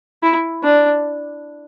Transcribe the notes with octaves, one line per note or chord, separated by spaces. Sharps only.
E4
D4